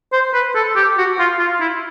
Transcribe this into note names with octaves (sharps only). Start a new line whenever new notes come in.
C5
B4
A4
G4
F#4
F4
F4
E4